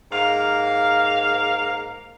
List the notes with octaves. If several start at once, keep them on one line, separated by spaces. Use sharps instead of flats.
G#2 A#3 F5